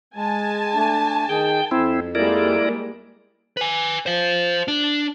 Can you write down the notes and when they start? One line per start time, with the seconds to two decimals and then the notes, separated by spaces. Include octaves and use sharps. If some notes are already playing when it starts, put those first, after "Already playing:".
0.16 G#3 G#5 A5
0.75 A3 D4
1.29 D#3 G#4 G5
1.71 F2 C4 E4
2.15 G3 G#3 A#3 E4 A#4 D5
3.57 B4 G#5
4.06 C5 F5
4.68 D4